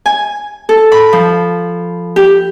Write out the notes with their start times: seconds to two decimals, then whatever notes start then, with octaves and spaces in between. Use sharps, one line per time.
0.06 G#5
0.69 A4
0.92 B5
1.13 F3
2.16 G4